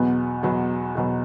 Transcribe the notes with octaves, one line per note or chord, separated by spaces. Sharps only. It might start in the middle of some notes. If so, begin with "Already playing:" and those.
Already playing: E2 B2 F#3 B3
E2 B2 F#3 B3
E2 B2 F#3 B3